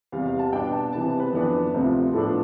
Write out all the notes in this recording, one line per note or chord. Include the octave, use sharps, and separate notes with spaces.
E2 C3 G3 F5
F5
A5
B2 B3 D4 G5
A5
C3 E3 G3 B3 A5
C5
B4
F2 E3 B3 D4
D2 C3 F3 C4
A2 F3 B3 D4 A4